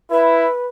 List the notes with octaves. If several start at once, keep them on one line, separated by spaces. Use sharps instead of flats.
E4 B4